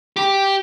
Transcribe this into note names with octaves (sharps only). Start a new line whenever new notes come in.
G4